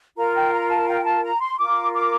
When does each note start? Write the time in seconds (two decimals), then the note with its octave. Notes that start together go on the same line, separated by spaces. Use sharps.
0.17 F4 A#4 A#5
0.35 G5
0.53 A#5
0.69 A5
0.88 G5
1.05 A5
1.23 A#5
1.40 C6
1.58 F4 A#4 D6
1.94 D6